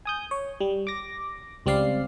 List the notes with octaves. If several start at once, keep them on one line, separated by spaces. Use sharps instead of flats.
G#5 D#6 G6
C#5
G3
D6 A#6
C#2 G3 C4 D5 F5 C7